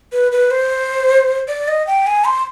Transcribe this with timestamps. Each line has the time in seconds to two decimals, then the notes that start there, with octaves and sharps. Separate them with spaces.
0.12 B4
0.32 B4
0.51 C5
1.48 D5
1.68 D#5
1.87 G5
2.07 G#5
2.25 C6